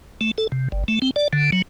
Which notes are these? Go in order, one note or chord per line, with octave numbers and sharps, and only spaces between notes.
A3
A4
C3
G1
A3
C4
D5
D3
F#3